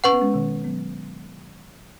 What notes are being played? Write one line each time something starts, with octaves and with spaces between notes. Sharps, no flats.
C#4 B4 F#5 C#6
B3
G#3 C#4
B2 D#3
F#3 B3